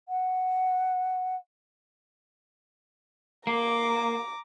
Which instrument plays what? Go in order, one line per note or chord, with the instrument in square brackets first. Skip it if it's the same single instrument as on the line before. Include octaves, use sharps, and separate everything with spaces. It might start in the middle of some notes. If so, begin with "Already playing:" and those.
[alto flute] F#5
[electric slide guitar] A#3 [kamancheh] A#5 D6